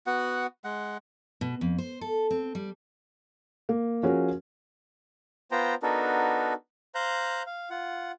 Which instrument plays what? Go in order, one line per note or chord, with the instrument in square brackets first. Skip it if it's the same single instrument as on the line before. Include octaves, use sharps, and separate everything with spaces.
[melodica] B3 F#4 F#5
G#3 F#5
[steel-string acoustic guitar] B2
F2
C5
A4
C4
G3
[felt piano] A#3
F3 C#4 F#4 G#4 A#4
[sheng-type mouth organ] B3 F4 C5 G5 A#5
B3 D4 D#4 F#4 A4 A#4
C5 F5 A#5 F#6 G6
F5
F4 F#5